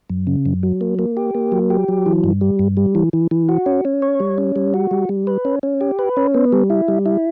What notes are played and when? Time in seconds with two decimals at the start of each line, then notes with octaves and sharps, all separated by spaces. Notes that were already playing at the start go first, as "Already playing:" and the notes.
0.10 F#2
0.27 C#3
0.46 F#2
0.63 F#3
0.81 A#3
0.99 A#3
1.17 G4
1.35 A#3
1.52 F#3
1.70 G4
1.88 F#3
2.06 E3
2.24 G2
2.41 G3
2.59 G2
2.77 G3
2.95 E3
3.13 E3
3.31 E3
3.49 F#4
3.66 C#4
3.85 C#4
4.02 C#5
4.20 G3
4.38 C#4
4.56 G3
4.74 F#4
4.91 G3
5.09 G3
5.27 B4
5.45 C#4
5.63 C#4
5.81 G4
5.99 B4
6.17 C#4
6.34 B3
6.52 G3
6.70 E4
6.88 G3
7.06 E4